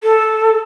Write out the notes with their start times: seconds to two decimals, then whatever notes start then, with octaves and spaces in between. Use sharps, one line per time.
0.02 A4